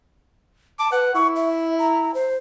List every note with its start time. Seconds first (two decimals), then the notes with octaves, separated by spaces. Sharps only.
0.79 A5 D6
0.92 B4 F#5
1.14 E4 C#6
1.36 E5
1.79 A#5
2.14 C5